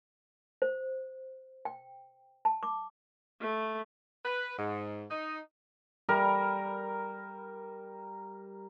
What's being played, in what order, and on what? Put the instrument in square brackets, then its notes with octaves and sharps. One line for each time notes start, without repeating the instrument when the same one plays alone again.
[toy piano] C5
G5
A5
D6
[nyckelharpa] A3
[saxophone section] B4
G#2
D#4
[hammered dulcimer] G3 A#4